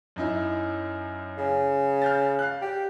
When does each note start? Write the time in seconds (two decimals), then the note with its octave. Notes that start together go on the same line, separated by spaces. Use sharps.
0.16 F#2 D#4 E4
1.38 C#3
2.02 F6 G6 A6
2.39 F5 F#6
2.62 G4